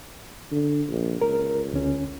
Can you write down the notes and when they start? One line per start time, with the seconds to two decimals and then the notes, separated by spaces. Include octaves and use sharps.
0.51 D3
0.89 A#1
1.22 C#2 A#4
1.74 D2 C#4